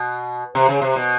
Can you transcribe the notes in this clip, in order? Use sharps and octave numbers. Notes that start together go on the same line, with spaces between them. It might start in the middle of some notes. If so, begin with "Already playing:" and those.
Already playing: B2
C3
C#3
C3
B2